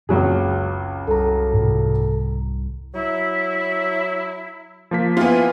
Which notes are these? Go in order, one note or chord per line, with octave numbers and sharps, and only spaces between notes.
F#1 C#2 F#3 A#3 C4 G#4
C2 A4 A#5
G#2 C3
F#3 E4
F3 A#3 B6
B3 E4 F4 G#5